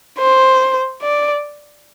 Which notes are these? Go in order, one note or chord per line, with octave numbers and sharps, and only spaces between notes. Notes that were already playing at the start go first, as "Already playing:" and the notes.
C5
D5